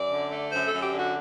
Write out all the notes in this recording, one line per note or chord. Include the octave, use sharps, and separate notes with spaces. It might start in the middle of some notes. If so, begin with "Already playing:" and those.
Already playing: F#2 D5
D3
A3
F#2 C5
F#2 A4
G4
D3
F#4